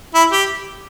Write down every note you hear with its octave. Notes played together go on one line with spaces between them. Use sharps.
E4
G4